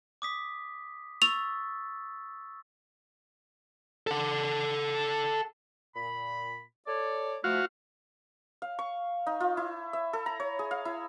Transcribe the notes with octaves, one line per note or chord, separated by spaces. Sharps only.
D6 D#6 B6
C#6 E6 A6 F7
A4 F#5
A#2 B5
A4 C#5 D5
F3 A3 E4 F#4 F5
F5
C#6
D#4
F4
E4
E5
A4
A#5
C#5
G#4
F5
E4